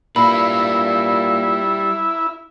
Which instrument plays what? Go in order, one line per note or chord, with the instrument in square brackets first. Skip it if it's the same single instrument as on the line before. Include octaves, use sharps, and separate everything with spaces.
[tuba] A#2 [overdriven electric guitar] G3 B4 [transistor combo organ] E4 [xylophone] B5